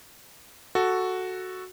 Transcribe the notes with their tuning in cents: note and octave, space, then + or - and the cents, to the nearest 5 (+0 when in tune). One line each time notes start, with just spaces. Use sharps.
F#4 +0 A4 +0